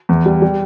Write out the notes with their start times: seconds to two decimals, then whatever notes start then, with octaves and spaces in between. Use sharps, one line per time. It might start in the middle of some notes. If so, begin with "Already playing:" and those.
0.09 E2
0.26 G3
0.42 G3